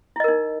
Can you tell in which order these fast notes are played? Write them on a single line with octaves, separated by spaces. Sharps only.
E4 D#5 A#4 D#4